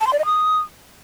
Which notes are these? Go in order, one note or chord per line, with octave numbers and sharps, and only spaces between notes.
A5
C6
D5
D#5
D#6